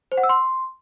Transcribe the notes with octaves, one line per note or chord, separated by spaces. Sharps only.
C5
F#5
E6
C6